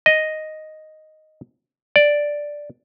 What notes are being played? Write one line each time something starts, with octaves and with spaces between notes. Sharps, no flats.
D#5
D5